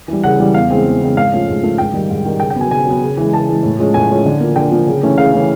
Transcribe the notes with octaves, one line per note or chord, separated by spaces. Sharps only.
E3 G3
C#3 F#5
E3 G3
E2 F5
C#3 E3 G#3 C4
E2
C#3 E3 G#3 C4
G#2 F5
F3 A3 C#4
G#2
F3 A3 C#4
G#2 G5
D#3 G3
G#2
D#3 G3
C#3 G5
G5
F#3 B3 G#5
C#3 G#5
F#3 B3
C#3
E3 G#3
C#3 A5
E3 G#3
A2
F3 G#3 C#4
A2 G#5
F3 G#3 C#4
D3
F3 A#3
D3 G5
F3 A#3
C#3
E3 A3 C#4
C#3 F5
E3 A3 C#4